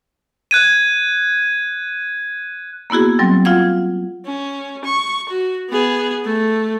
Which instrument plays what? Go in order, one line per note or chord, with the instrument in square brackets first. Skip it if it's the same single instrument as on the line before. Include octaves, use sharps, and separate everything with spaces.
[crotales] F#6 G#6 D#7
[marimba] A#3 B3 E4 F#4 G#4
F#3 G3 C4
F4 F5 F#5 G#6
[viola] C#4
C#6
F#4
B3 G#4
A3